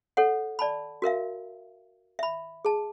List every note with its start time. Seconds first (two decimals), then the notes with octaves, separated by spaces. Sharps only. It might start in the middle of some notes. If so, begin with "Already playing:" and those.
0.17 A4 C#5 F#5
0.59 D5 A5 B5
1.02 F#4 A#4 E5 F5
2.19 E5 B5
2.65 G#4 A5